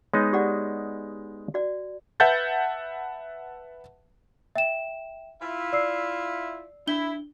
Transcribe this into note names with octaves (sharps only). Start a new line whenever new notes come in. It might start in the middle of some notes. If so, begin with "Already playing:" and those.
G#3 B3 D#4 C#5
G4 D5 F#5
F#4 D5
B4 E5 F#5 A5 G6 A6
E5 G5 E7
E4 F4 E5
D5 E6 C7
D4 E4 G7